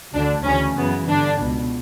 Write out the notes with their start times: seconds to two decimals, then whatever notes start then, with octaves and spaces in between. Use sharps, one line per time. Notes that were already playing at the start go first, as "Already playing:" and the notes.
0.15 D2 D3 D4
0.46 D2 C#3 E3 C#4
0.77 F#2 C#3 E3 B3
1.08 G2 D3 D4
1.40 C#2 B2